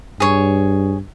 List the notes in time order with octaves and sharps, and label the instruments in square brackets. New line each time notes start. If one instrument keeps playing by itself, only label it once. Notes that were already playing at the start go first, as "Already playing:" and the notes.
[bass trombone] G2 [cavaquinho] G#4 C#5